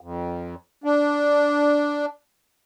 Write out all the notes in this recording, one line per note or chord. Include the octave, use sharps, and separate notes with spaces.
F2
D4